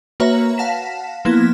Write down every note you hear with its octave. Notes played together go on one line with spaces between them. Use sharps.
A#3 F#4 B4 C#5 E5 A#5
F5 F#5 A5 A#6 B6 E7
F3 A#3 B3 E4 G#6